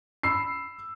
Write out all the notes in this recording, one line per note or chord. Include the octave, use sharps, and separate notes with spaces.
B5 E6 C7